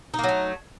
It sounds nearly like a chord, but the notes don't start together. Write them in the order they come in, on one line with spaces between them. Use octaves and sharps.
D#4 A#3 F#3 A3